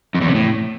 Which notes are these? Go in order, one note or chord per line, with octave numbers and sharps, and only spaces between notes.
F2
E2
C3
A2